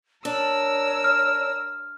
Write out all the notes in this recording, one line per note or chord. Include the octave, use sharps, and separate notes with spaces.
D4 A#4 C#5 E6
F6